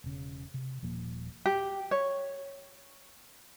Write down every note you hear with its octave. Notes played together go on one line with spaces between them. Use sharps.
E1 C#3
C3
D#1 A#2 F3 A#3
G4
C#5